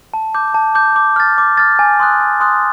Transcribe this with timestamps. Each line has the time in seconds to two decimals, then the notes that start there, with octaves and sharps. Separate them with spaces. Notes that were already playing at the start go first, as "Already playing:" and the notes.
0.14 A5
0.34 D6 G6
0.54 A5
0.75 D6 G6
0.96 D6
1.16 F6 A6
1.38 D6
1.57 F6 A6
1.79 G#5
2.00 C6 D#6 F#6
2.21 G#5
2.40 C6 D#6 F#6